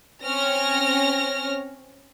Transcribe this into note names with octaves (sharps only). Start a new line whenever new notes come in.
C4 C#4 C#5 F6 A#6